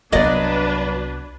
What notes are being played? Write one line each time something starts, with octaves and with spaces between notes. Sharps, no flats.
C2 G2 F#3 B3 D4 B4 D5 D#5